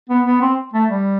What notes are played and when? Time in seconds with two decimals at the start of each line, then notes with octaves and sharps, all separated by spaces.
0.10 B3
0.26 B3
0.42 C4
0.74 A3
0.90 G3